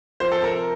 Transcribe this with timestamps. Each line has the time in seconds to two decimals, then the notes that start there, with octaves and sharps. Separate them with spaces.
0.20 C3 F3 C5
0.32 A4
0.44 A#4